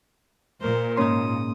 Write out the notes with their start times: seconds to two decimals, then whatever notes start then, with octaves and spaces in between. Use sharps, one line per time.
0.61 A#2 A#4 C5
0.97 G#2 C#3 A#3 D#4 C6 D#6